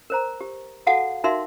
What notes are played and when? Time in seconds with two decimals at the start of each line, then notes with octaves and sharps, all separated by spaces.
0.10 A#4 C5 A#5
0.41 G4
0.87 F#4 A4 F5 F#5 A5
1.24 D#4 F#4 A#4 E5 F5 C6